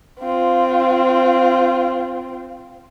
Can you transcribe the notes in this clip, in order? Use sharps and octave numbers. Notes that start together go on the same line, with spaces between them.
C4 F4